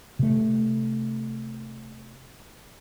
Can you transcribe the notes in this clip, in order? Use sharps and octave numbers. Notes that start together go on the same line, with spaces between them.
C3 A3